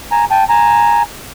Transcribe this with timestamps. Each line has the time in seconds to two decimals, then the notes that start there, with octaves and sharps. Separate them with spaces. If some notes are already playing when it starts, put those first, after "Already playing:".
0.11 G#5 A#5
0.31 G5 A5
0.49 G#5 A#5